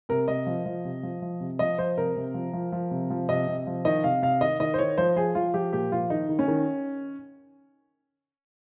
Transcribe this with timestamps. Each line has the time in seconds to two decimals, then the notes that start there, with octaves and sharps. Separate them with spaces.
0.09 C3 A#4
0.28 C3 D#5
0.47 F3
0.66 F3
0.85 C3
1.03 F3
1.22 F3
1.41 C3
1.59 F3 D#5
1.78 F3 C5
1.97 C3 A#4
2.16 C3
2.34 F3
2.53 F3
2.72 F3
2.91 C3
3.10 F3
3.29 C3 D#5
3.48 C3
3.67 F3
3.85 D#3 D#5
4.04 C3 F5
4.22 C3 F5
4.41 D#3 D#5
4.60 D#3 D#5
4.74 C5
4.78 D#3 C#5
4.98 F3 C5
5.16 F3 G#4
5.35 F3 F4
5.54 F3 G4
5.73 A#2 G4
5.92 F3 F4
6.10 D#3 D#4
6.29 D#3
6.39 C#4
6.48 D#3